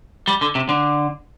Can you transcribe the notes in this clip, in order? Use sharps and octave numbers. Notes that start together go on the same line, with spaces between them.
G3
D3
C3
D3